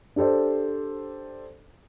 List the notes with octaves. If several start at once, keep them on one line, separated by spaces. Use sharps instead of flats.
D4 G4 A4 C5 D5